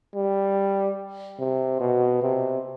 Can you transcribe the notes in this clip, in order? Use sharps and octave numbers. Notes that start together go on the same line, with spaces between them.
G3
C3
B2
C3